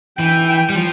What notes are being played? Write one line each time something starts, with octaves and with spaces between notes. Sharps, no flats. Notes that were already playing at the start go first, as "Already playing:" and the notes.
E3 G5
G3
F3